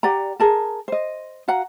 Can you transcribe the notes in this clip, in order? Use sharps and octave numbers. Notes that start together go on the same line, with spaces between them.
G4 D5 F#5 A#5
G#4 A#4 A5
C5 D#5
F#4 F5 F#5 A#5